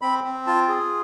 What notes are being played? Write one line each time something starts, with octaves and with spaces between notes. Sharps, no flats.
C4 B5
C4
F4 A5
G#4